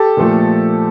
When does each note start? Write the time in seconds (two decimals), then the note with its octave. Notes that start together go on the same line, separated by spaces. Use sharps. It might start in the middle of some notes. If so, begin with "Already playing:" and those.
Already playing: G4 A4
0.17 A#2 F3 A3